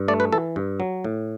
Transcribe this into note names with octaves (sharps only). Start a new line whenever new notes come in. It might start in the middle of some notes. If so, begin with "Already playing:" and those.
Already playing: G2
A3 D5
B4
E3 A4
G2
F#3
A2